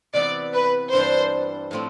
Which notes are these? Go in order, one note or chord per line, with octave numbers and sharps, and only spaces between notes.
C3 E3 B3 E4 D5
B4
G2 E3 G3 D4 C5
A2 F3 A3 C4